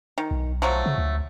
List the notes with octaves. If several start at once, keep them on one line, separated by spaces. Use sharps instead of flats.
D#3
B1
F3 F#3 A3
C#3
D2